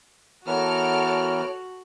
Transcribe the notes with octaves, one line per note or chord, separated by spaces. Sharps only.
E3 B3 F#4 A4 A#4 C#5 F6 D7